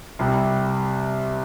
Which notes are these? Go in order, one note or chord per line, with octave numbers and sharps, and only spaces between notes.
C2 C3 G3